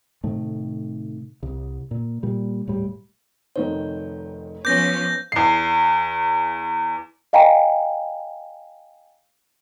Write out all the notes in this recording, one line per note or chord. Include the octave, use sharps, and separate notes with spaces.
A2 C3 D#3 A3
C2
A#2
A#2 G3
D#1 A2 G3
F1 D#3 C5 C#5
F3 B3 C#4 D6 G6 A#6
E2 C7
D#5 F5 G5 G#5 A#5